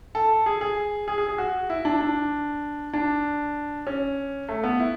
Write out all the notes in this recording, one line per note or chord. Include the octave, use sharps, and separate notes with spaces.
A4
G#4
G#4
G#4
G#4
G#4
F#4
E4
D4
D4
D4
C#4
A3
B3
E4